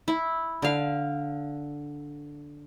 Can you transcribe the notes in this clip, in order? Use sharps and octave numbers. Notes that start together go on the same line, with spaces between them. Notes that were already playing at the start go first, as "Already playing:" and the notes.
E4
D3 F5